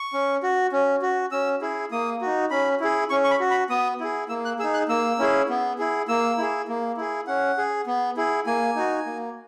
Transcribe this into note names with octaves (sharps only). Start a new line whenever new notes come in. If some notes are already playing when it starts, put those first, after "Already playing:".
Already playing: C#6
C#4
F#4
C#4
F#4
C#4 E6
E4 G#4
A#3 D#6
D#4 F#4
C#4 B5
E4 G#4
C#4 C#6
C#6
B5
F#4
B5
B3 D#6
E4 G#4
A#3 E6
F#6
D#4 G#4 E6
F#6
A#3 E6
C#4 E4 G#4
B3
E4 G#4
A#3 E6
E4 G#4
A#3
E4 G#4
C#4 F#5
G#4
B3
E4 G#4
A#3 G#5
D#4 F#4
A#3